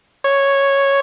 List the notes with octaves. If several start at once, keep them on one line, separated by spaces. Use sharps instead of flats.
C#5